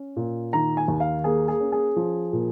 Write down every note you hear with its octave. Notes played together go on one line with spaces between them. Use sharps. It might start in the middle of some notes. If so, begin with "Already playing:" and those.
Already playing: C#4
A#2
D#3 A#5
G#5
D#2
F5
A#3 G#4
G#4
C#4
G#4
F3
A#2